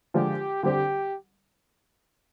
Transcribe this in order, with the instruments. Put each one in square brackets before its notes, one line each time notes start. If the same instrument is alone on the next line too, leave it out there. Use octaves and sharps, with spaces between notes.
[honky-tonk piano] D3 F3 G#3 [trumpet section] G4
[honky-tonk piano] D3 G3 C4 [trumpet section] G4